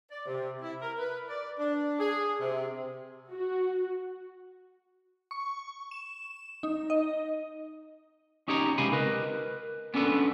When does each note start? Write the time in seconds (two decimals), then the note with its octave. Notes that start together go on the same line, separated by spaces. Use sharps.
0.11 D5
0.26 C3
0.61 E4
0.81 A#4
0.99 B4
1.29 D5
1.59 D4
1.99 G#4
2.40 C3
3.31 F#4
5.31 C#6
5.91 E7
6.63 D#4
6.90 D#5
8.48 C#4 D#4 G4 C#5 A5 A#5
8.78 C#2 C3 G4 F5 G#5 B5
8.93 A#4 B4 D#5
9.94 B3 C#4 D4 A4 B4